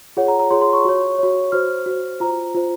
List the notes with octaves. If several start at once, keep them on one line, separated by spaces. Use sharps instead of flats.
F4 G#4 C#5 F#5
A#5
A#5
F4 G#4 C#5 C6
C6
C#6
F#4 C#5
F#4 C#5
F#4 C5 F6
F#4 C5
F4 C5 A#5
F4 C5